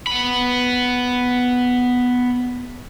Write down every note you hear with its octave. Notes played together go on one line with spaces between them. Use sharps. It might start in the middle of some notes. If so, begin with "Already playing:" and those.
B3 B5